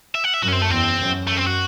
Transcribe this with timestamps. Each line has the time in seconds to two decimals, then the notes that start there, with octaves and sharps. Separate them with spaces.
0.15 E5
0.24 F#5
0.34 E5
0.42 F#2 F#4
0.48 C#4
0.52 C4
0.62 A3
0.70 E2 C4
0.99 F#2
1.27 A3
1.37 C4
1.46 F#4